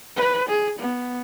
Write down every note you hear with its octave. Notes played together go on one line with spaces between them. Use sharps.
B4
G#4
B3